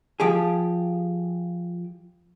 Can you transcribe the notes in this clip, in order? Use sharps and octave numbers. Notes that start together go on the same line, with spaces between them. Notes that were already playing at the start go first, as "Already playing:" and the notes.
F3 G4 G#4